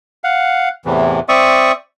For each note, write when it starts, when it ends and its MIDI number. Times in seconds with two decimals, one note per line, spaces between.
0.24 0.69 77
0.24 0.69 78
0.85 1.20 40
0.85 1.20 45
0.85 1.20 48
0.85 1.20 52
1.29 1.72 60
1.29 1.72 74
1.29 1.72 76
1.29 1.72 85
1.29 1.72 87